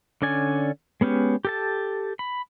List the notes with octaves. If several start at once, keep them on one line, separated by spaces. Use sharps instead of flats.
D3 C#4 D5 G#5
G#3 B3 C#4 G4
G4 A4 A5
B5